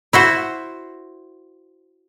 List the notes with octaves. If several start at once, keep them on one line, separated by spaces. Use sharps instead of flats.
E4 F#4 C5